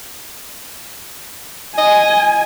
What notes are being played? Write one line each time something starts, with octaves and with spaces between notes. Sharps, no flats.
D#5 G#5